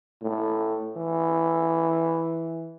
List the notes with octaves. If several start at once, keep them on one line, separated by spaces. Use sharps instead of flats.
A2
E3